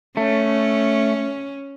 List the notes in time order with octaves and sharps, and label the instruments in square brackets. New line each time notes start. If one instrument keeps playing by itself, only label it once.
[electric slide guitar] A3 [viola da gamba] C#4